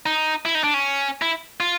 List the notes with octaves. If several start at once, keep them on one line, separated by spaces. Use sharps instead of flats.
D#4
E4
D#4
D4
C#4
E4
F4